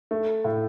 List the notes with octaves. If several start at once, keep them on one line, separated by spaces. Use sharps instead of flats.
A3
A2